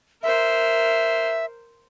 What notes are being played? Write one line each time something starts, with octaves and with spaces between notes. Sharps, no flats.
A#4 C5 E5